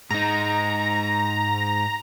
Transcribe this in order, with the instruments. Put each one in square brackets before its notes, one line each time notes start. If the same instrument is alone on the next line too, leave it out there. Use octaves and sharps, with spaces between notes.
[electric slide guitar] G#2 D#4 [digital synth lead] A#5